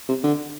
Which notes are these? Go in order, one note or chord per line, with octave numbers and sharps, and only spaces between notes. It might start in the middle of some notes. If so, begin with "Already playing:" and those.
C3
D3